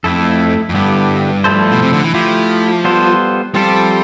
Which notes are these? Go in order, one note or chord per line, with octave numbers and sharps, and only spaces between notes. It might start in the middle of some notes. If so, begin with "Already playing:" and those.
F2 A3 E4 A4
F2
G2 D3 G3 B3 E4 G4
F3 A3 E4 A4 C5
B2
C3
D3
E3
F3 A3 E4 G4
G3 B3 F4 A4 C5
F3 G3 C4 F4 A4